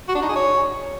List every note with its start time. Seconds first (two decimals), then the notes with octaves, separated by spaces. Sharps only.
0.08 F#4
0.15 D4
0.22 D#4
0.29 G#4
0.36 C#5